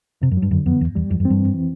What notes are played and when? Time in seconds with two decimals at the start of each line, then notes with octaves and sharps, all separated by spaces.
0.22 F2 C3
0.31 F#2
0.37 F#3
0.42 G2
0.51 F#2 D3
0.66 F2 B3
0.81 E2 G2
0.95 E2 G3
1.10 F2 E3
1.20 F#2
1.25 C4
1.30 G2
1.40 F2
1.54 E3